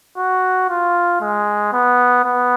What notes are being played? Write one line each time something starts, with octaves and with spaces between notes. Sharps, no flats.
F#4
F4
G#3
B3
B3